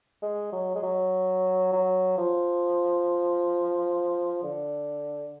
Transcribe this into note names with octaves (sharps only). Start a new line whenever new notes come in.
G#3
F#3
G#3
F#3
F#3
F3
D3